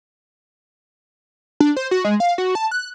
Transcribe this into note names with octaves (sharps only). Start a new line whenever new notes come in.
D4
C5
F#4
G#3
F5
F#4
A5
F#6